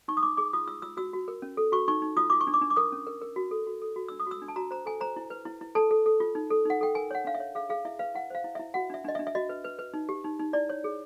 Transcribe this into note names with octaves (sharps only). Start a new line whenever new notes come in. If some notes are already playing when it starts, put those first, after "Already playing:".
D#4 C#6
D#6
D#4 D6
G#4 D6
F4 D#6
F4 E6
F4 E6
F#4 E6
F#4
A#4
C#4
A4
F#4 C#6
D#4 C#6
D#4
F4 D#6
F4 D6
C#6
D4
D6
D4
D6
A#4 D#6
C#4
A#4
A#4
F#4
A4
F#4
A4
F#4
D4 E6
D#6
F#4 E6
D4
A5
F#4 A#5
C5 A#5
A4 G#5
C5 A#5
E4
B4
E4
E4
A4 A5
A4
A4
F4
D#4
A4
D#4 F#5
A4 G5
A#4 G#5
C#5 F#5
D4 F5
E5
C#5
G#4 F5
G#4 F5
E4 E5
B4 F5
E4 F#5
C5 F5
E4
E5
E4
F#4 F#5
D4 E5
D4 D#5
E5
D4
E5
F#4 D#5
B4
B4
B4
D#4
G4
D#4
D#4
E4 D5
C#5
G#4